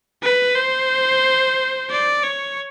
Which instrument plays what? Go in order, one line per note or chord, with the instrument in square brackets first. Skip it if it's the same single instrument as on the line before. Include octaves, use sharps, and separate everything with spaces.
[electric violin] B4
C5
D5
C#5